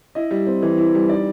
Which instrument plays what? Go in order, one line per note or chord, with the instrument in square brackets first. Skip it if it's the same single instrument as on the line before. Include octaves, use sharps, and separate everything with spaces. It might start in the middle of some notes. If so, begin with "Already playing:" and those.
[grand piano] E4 D#5
G3
C4
E3
E4
G3
D#4 D5